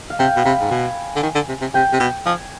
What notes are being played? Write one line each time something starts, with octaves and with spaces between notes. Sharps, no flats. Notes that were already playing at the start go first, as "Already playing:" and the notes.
Already playing: D#5
F5
C3 G5
B2
C3 B5
G#2
B2 G#5
D3
D#3
D3
C3
C3
C3 G5
C3
B2
F3 G#5